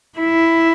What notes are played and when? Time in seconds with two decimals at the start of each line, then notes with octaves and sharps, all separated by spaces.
0.19 E4